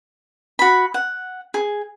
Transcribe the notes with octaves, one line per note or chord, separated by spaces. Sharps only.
F#4 B5
F#5
G#4